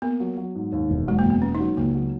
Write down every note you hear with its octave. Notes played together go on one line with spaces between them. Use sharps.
A#3 B3
F#3
F#3
G#2
D#2
E1
F#3 G#3
A#3
E1
B3
B3 C#4
D#4
F#3
C#2 A#3
F#3